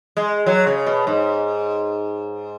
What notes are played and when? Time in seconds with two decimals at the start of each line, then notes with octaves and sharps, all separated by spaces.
0.17 G#3
0.46 F#3
0.67 C#3
0.86 B2
1.07 G#2